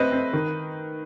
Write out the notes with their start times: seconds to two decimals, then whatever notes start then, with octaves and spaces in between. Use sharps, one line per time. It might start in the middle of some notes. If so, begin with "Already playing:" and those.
Already playing: A3 C4 B4 D#5
0.12 C4
0.33 D#3